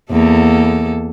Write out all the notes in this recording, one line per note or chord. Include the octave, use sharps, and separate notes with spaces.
E2 A#3 A4